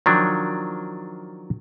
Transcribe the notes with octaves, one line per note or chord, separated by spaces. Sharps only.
D#3 F3 F#3 D4